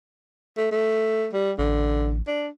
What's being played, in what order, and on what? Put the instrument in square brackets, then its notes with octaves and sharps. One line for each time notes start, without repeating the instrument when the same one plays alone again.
[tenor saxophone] A3
A3
G3
[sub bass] A1 [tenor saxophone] D3
[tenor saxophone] D4